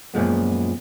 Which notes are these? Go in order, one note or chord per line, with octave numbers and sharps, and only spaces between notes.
F#2 A#2 F3 G#3 B3